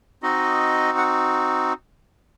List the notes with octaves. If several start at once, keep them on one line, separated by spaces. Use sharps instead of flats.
C4 D#4 F#4 D#5
F#5